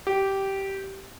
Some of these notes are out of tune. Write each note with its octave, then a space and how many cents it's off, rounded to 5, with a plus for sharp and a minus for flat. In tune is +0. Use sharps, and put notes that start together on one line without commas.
G4 -10